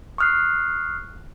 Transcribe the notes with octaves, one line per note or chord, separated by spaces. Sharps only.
C#6 D#6 F6 F#6 C7